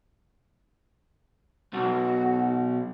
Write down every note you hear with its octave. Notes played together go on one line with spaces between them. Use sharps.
B1 F#4